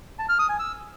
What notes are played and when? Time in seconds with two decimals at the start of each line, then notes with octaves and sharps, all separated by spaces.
0.19 A5
0.29 F6
0.39 D#6
0.49 G#5
0.59 E6